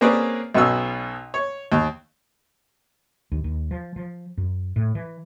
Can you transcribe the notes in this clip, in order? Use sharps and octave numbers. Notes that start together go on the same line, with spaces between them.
A#3 C4 C#4 G#4 B4 D5
B1 B2 C#4 E6
C#5
D#2
D#2
D#2
F3
F3
F#2
A2
E3